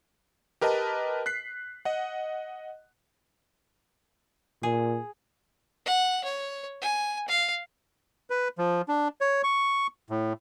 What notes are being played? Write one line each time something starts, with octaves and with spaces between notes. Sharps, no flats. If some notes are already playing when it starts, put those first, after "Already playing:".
G4 A#4 B4 D#5 A5
F#6 B6 C7
D#5 F#5
A#2 G#4
F#5
C#5
G#5
F5
B4
F3
D4
C#5
C#6
A2